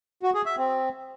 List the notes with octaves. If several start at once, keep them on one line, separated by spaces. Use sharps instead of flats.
F#4
G#4
E5
C4